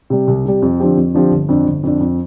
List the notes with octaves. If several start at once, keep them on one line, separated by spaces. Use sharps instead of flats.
C3 G3
C2
C3 G3
F2
D3 F3 C4 G4
F2
D3 F3 C4 G4
G1
F2 D3
G1
F2 D3
F2